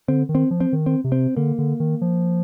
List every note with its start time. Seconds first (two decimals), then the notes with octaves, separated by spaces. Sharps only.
0.08 D3 C4
0.29 D#3
0.35 C4
0.51 F3
0.60 C4
0.73 D#3
0.86 C4
1.04 C3
1.12 C4
1.37 D3 A#3
1.58 D3
1.80 D#3
2.01 F3